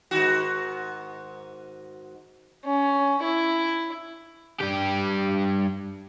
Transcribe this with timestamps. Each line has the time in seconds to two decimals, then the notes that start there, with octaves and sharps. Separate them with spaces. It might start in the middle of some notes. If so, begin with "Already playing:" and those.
0.11 G#2 D#3 F#4
2.65 C#4
3.23 E4
4.61 G2 G4